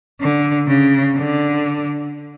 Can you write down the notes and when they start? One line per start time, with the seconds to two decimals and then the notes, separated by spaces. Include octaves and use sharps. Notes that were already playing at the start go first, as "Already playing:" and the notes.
0.21 D3
0.68 C#3
1.16 D3